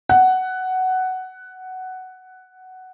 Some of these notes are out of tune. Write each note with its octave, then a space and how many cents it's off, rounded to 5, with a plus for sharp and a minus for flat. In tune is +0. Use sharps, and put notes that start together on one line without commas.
F#5 +10